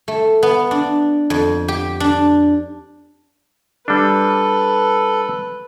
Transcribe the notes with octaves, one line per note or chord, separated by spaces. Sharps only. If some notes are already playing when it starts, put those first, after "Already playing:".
A3
B3
D4
F2
G4
D4
G3 D4 A4 B4